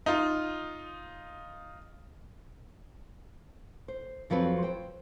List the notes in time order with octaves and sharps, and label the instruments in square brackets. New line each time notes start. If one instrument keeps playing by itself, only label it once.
[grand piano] D#4 F4
[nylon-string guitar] C5
F2 F3 F#3 C4 B4
C5 G5